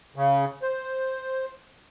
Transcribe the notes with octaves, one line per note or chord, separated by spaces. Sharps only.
C#3
C5